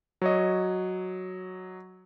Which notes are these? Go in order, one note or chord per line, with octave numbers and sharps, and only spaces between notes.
F#3 C#5 D#5